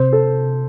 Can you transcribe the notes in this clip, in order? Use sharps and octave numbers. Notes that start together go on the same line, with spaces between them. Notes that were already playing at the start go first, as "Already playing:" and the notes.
Already playing: C3 C5
A4